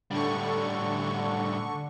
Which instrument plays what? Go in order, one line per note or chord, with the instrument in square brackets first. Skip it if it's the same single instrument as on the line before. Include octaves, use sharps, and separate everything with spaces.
[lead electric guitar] A2 G3 [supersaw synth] D3 C#6